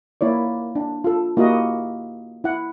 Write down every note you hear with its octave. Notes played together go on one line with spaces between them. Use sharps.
A#3 E4 C#5 D5
D4
F4 A4
A#3 E4 F#4 G4 D#5
E4 F#5